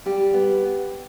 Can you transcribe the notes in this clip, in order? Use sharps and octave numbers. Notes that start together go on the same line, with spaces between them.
G3 G4
B3